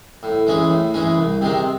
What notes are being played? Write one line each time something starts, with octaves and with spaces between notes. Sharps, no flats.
A2
E3 G#3 C#4 G#4
A2
E3 G#3 C#4 G#4
C2
C3 D#3 G#3 C4